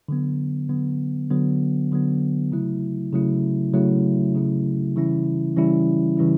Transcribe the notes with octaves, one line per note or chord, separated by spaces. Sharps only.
D3 F#3 B3
D3 F#3 B3
D3 F#3 B3
D3 F#3 B3
C#3 F#3 A3 E4
C#3 F#3 A3 E4
C#3 F#3 A3 E4
C#3 F#3 A3 E4
C#3 E3 G3 C#4 E4
C#3 E3 G3 C#4 E4
C#3 E3 G3 C#4 E4